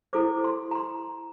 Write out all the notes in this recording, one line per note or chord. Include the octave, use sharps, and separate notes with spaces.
E4 A4 C5 D6
C6
A#5
C6